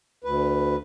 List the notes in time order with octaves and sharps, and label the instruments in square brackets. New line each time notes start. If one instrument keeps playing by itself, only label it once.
[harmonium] D2 B4